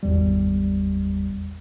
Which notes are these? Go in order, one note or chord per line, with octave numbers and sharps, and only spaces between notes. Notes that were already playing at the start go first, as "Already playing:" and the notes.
G#1 E2 G3